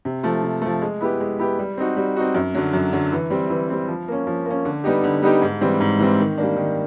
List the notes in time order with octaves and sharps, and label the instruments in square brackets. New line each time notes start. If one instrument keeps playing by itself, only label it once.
[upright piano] C3
F3 A3
C3
F3 A3
G#3
B3 E4 G4 B4
G#3
B3 E4 G4 B4
G3
C4 D#4 F#4
G3
C4 D#4 F#4
F#2
D3 F#3
F#2
D3 F#3
E3
G3 C4
E3
G3 C4
F3
A#3 C#4
F3
A#3 C#4
D3
G3 B3 D#4 G4
D3
G3 B3 D#4 G4
G#2
E3 G3 C4
G#2
E3 G3 C4
D#3
G3 A#3 D4
D#3